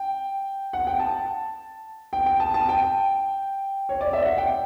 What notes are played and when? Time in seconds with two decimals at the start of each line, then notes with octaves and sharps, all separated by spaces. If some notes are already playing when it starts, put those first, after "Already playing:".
Already playing: G5
0.73 F#5
0.87 G5
0.99 A5
2.13 G5
2.26 G5
2.40 A5
2.54 A5
2.69 G5
3.89 C#5
4.01 D5
4.13 E5
4.25 F#5
4.38 G5